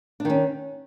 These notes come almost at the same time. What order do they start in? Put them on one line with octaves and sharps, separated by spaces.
D4 D#3 C#4